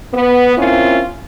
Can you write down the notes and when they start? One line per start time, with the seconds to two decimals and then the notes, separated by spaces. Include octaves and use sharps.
0.14 B3
0.57 A#3 C4 C#4 E4 F4